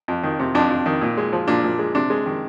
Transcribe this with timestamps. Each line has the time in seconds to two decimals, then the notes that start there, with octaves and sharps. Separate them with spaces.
0.08 F2
0.23 D#3
0.39 C3
0.55 F2 D4
0.70 F2
0.86 D#3
1.01 A#2
1.17 G#3
1.33 F3
1.48 A#2 D4
1.64 A#2
1.79 G#3
1.95 C3 D4
2.10 G#3
2.26 D#3